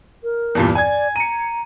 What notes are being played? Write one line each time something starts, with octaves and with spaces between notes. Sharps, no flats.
A#4
E2 G2 A#2
D5 G#5 G#6
A#5 C#7 D#7